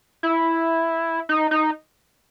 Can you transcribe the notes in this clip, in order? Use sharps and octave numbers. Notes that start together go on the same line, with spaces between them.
E4
D#4
D#4